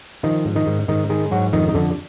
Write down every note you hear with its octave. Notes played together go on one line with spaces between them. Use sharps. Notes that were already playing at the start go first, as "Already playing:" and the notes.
D#3 F3 D#4
G#2
D#3 D#4
G#2
G#2 D#3 D#4
D#3 G#3 D#4
G#2 F#3 F#4
F2 D#3 D#4
D#4
F2 D3 D4